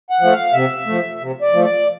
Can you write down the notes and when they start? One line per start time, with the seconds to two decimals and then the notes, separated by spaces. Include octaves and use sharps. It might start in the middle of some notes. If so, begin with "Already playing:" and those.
0.10 F#5
0.21 F3 A3
0.32 F5
0.53 C3 E5
0.86 F3 A3
1.20 C3
1.41 D5
1.53 F3 A3
1.64 D5